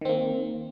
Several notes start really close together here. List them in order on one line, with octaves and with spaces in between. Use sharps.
D#3 C4 A#3